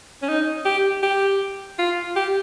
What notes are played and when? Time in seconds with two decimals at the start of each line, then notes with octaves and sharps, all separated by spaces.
0.23 C#4
0.29 D#4
0.65 G4
1.03 G4
1.79 F4
2.16 G4